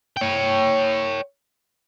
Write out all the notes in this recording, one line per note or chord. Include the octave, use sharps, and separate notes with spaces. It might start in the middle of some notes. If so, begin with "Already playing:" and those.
C#5 G5